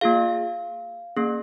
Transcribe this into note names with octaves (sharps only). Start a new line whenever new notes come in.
A#3 F4 G#4 F5
A#3 C#4 G#4